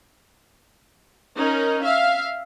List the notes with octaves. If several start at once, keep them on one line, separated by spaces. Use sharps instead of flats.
C#4 D#4 A#4
E5 F5